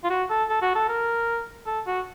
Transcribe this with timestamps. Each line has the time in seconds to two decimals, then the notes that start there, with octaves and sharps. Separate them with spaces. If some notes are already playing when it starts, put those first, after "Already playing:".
0.04 F4
0.10 F#4
0.30 A4
0.49 A4
0.62 F#4
0.75 A4
0.89 A#4
1.66 A4
1.87 F#4